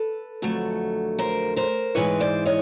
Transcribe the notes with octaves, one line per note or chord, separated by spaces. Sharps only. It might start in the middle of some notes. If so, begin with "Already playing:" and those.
Already playing: A4 B4
F2 D3 F#3 A3
A#4 C5
A#4 C5
G#2 E3 G#3 B4 C#5
C5 D5
C#5 D#5